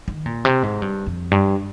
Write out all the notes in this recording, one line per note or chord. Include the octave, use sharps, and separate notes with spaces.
D#3
A#2
C3
G#2
G2
F2
G2